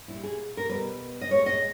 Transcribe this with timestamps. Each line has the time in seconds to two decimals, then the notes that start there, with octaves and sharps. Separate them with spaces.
0.08 A#2 G3 E4
0.23 G#4
0.57 A#4
0.69 B2 G3 B4
1.21 D#5
1.30 A#2 G#3 C#5
1.46 D#5